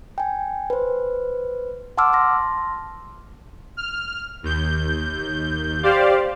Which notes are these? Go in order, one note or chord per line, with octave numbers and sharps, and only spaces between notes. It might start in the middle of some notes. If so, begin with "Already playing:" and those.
G5 G#5
B4 C5
F#5 A5 C6 D6 E6 F6
A5 C6 A#6
F6
D#2 G6
G4 C5 D5 F5